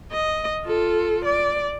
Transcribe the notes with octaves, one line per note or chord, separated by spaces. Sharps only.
D#5
F4 A4
D5